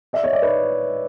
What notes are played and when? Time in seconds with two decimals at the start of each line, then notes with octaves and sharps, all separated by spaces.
0.13 D5 E5
0.23 C#5 D#5
0.33 D5 E5
0.42 B4 C#5